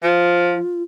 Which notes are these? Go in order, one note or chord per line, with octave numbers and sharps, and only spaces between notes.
F3 F4